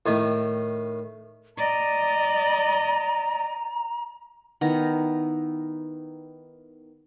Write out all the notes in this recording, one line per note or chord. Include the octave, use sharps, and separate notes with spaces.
A2 D#3
D5 D#5 A#5
D#3 B3 E4 A#5